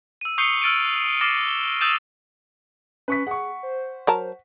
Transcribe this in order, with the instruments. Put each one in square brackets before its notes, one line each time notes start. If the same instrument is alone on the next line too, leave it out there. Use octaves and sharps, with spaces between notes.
[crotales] E6 D#7
C#6 D#6 G6 C7 C#7 G7
E6 F6 A6 D7 D#7
D6 F6 A6 A#6 C7 D#7
G7
D#6 E6 G6 A6 D#7 E7
[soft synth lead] C#4 [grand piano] B4 C#6 B6
[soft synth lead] G#4 [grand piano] F#5 C#6
[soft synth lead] C5
[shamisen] F#3 A#4 A5